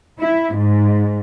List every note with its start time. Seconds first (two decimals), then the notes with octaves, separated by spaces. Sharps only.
0.19 E4
0.53 G#2